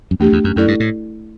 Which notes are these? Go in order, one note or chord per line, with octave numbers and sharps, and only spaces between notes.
F#2
E2 A3 D4 G4
E2
F#2
F#2 A3 E4 A4 D5
G2
A2